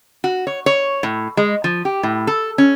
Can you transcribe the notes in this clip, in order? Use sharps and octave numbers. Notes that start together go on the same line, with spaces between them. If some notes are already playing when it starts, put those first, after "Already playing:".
F#4
C#5
C#5
A2
G#3
F3
G4
A2
A4
C#4